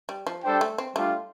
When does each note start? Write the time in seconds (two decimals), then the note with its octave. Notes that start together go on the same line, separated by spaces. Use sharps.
0.09 G3
0.27 F3
0.44 G3 D4 A4 C5 G5
0.61 A3
0.78 C4
0.96 G3 A3 D4 F4